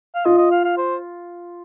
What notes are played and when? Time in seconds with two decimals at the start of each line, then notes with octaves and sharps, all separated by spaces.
0.15 F5
0.25 F4 D#5
0.38 D#5
0.51 F5
0.65 F5
0.78 C5